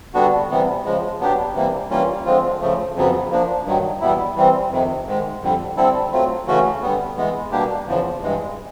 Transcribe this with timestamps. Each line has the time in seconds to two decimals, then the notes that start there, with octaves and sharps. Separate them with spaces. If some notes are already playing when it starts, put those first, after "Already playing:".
0.14 D3 G3 B3 D4 F#4
0.50 C3 E3 G3 B3
0.85 C#3 F3 G#3
1.20 F#3 B3 D4 G4
1.55 C3 E3 G3 A#3
1.90 E3 G3 A#3 C#4 F4
2.25 D3 F3 G#3 C4 F4
2.61 C#3 F3 A3
2.96 F2 C#3 F#3 B3
3.31 F3 A#3 D4
3.65 G2 D#3 F#3
4.01 E2 B2 G3 B3 E4
4.36 E3 G3 C4
4.71 F2 C3 D#3
5.06 G#2 D#3 G#3
5.41 F2 D3 G3
5.77 D3 G3 C4 E4 A4
6.12 F#3 A3 C4 F4
6.47 C#3 E3 A3 C#4 F#4
6.82 D3 G3 B3
7.17 E3 G#3 B3
7.52 B2 G3 A#3 D4 G4
7.87 E2 C#3 F3
8.22 G2 E3 G#3